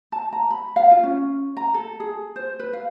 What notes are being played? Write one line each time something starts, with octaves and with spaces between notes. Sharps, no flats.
A5
A#5
B5
F5
F4
C#4
A#5
A4
G#4
C5
B4
F5